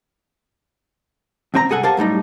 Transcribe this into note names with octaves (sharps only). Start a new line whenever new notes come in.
E2 G#2 C4 B4 A#5
C2 G#2 G#4 A4 F#5 G#5
G4 A#4 C5 F5 F#5 A5
F#2 A2 G3 D#4